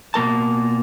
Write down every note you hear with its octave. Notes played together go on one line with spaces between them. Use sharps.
B2 A#3 A#4 A5